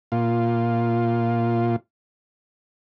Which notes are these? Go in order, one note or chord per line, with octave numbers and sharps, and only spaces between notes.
A#2 F4